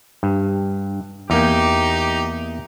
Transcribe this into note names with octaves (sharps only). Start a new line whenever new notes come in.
G2
E2 A#3 D#4 G4